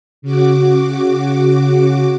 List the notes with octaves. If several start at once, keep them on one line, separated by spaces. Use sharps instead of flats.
C#3 F#4 D6